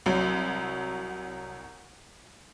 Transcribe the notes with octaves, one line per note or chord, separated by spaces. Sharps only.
C2 F#3